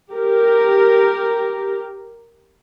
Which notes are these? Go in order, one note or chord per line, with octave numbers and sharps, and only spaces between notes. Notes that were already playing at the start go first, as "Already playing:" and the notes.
G4 A#4